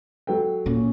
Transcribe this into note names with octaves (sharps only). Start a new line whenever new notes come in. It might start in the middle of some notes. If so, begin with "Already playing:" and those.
F#3 A4 G5
A#2 C#4